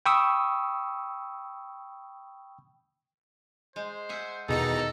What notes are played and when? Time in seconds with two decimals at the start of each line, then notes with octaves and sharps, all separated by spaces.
0.06 G5 B5 C#6 D#6 E6
3.76 G#3 C5
4.09 G#4 E5 F#5
4.48 E2 B2 D#3 D#4 G#4 A4 A#5